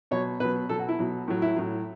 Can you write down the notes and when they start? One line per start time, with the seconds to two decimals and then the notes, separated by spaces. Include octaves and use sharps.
0.11 B2 F#3 C#5
0.40 B2 B4
0.44 F#3
0.69 B2 F#3 A4
0.79 F#4
0.89 E4
0.99 B2 F#3
1.28 A2 F#3
1.42 E4
1.56 A2 F#3